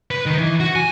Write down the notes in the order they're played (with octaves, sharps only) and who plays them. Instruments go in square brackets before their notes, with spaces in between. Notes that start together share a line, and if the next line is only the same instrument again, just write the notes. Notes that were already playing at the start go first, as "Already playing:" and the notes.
[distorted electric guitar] B4
D#3
E3
F#4
G#5